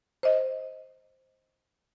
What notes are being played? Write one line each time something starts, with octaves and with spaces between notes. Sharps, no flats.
C5 D#5